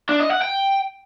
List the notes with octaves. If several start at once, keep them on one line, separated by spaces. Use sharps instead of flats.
D4
D#5
F#5
G5